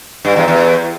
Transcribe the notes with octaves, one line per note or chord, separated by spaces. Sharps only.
G2
E2
E2